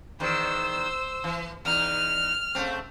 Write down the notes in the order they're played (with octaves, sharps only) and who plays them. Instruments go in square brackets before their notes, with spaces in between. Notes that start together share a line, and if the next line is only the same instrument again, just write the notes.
[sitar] E2 D#3 [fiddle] C5 E6
[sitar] E3
[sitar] E2 D#4 [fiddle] F6
[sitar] C#3 A3 C4